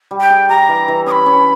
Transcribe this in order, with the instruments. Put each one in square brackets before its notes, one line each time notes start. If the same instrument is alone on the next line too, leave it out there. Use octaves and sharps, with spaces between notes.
[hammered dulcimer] G3
[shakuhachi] G5
[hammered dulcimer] G#4
[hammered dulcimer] G4 [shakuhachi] A#5
[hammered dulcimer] E3
E3
[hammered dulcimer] C#4 [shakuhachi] D#6
[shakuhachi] B5
[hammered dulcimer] C#4